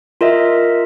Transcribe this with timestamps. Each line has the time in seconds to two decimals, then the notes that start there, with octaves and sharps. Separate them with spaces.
0.21 F4 A#4 D#5 E5